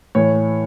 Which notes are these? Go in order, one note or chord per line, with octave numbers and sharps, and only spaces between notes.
A2 E3 C#5